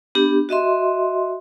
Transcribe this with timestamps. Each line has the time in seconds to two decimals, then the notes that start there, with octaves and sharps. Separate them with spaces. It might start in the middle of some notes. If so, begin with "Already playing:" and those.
0.15 B3 D4 G4
0.49 F#4 D#5 E5 C6